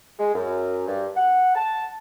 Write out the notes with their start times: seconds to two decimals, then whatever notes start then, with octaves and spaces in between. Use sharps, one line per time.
0.19 G#3
0.34 F#2
0.88 G2
1.16 F#5
1.55 A5